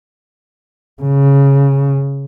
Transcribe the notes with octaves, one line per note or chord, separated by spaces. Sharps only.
C#3